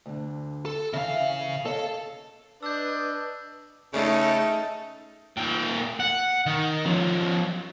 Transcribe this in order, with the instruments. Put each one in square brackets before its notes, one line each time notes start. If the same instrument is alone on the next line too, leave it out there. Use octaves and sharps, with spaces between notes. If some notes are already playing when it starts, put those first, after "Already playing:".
[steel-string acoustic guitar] D2 D3
[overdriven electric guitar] A4
[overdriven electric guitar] C#3 F5 [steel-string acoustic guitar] E3 E5
[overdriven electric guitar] A4 [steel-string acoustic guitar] C#5 D#5 F5
[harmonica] D4 [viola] B4 D#5 [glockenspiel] E6 G6
[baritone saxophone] C#3 [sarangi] A3 [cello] D#4 A4
[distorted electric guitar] A#2 G5
F#5
D#3
F3 C#4